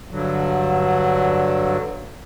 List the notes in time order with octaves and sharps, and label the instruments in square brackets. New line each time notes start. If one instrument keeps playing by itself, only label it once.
[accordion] G2 D3 F#3